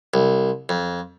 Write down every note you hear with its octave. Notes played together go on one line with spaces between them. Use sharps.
C2
F2